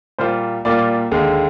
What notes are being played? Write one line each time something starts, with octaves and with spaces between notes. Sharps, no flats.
A#2 G3 A#3 F4 C5
A#2 G3 A#3 F4 D5
D#2 D3 G#3